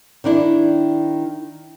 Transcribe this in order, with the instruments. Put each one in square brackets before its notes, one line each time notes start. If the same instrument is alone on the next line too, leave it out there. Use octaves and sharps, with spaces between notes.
[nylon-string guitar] D#3 D4 E4